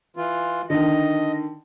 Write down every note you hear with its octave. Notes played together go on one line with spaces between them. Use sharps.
E3 F4
D3 D#3 D#5